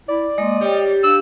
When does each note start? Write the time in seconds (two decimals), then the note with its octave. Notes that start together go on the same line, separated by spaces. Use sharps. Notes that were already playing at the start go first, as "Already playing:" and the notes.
0.09 E4 D5
0.38 G#3 A#3 D#5 C6
0.61 G3 G4 C#5
1.04 D4 F5 E6